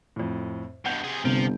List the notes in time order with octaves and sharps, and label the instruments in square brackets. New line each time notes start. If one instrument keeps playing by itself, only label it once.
[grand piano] F2 A2
[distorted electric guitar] G2 B2 [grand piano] F#5 G6
[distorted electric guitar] C3 G#4
[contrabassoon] G1 [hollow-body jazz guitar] C3 [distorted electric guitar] F3 [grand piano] D7